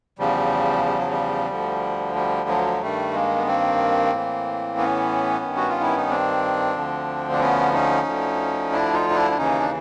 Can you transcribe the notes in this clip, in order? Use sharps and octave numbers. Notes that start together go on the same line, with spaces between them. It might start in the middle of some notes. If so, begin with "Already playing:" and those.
E2 C#3 F3 G3
G3
F#3
G3
D2 D3 F3
G3
F#3
G2 D#3 G3 A3
G#3 A#3
B3
A#3 C4
A2 E3
B3 C#4
G2 D#3
F#4
F4
E4
D#4
C4 D4
D2 D3 F3
D4
B3 C#4
C#4 D#4
D2 D3 F3
D4 E4
D#4 F4
D#4
D4 E4
D4
D#2 C#3 E3 C#4 D#4
D4